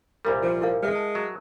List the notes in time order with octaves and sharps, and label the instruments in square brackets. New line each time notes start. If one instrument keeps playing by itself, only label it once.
[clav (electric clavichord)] C2 A#2 G3 [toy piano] A#4 B5
[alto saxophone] F3
[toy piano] E4 A#4 F5
[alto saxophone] G#3 [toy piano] B4 E5
[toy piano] A5
[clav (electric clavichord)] F#3